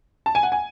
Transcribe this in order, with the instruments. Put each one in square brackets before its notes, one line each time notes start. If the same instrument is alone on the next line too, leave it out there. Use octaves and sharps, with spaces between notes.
[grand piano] A5
G#5
F#5
G#5